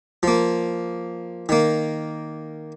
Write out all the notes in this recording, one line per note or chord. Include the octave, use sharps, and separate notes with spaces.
F3 A#3
D#3 A#3